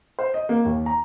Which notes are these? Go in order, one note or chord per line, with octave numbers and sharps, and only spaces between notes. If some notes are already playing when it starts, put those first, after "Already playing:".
C5
D#5
A#3
D#2
A#5